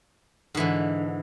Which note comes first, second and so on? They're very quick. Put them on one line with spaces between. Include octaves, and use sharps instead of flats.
G#2 E3 D3